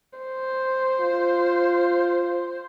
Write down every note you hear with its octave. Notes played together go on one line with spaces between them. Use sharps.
C5
F4